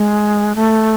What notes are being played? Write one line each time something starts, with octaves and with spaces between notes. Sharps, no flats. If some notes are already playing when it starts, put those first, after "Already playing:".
Already playing: G#3
A3